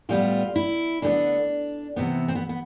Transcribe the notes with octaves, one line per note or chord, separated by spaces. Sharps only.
A2 G3 B3 F4
E4
D3 G3 B3 D4
C3 E3 B3 C4
C4
B3
B3